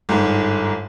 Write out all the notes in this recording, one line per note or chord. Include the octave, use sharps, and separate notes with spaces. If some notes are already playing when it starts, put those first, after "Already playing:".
G1 G#2